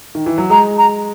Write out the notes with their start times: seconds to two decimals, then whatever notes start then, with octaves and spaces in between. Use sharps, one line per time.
0.15 D#3
0.26 E3
0.38 F#3
0.50 G#3 A#5
0.78 A#5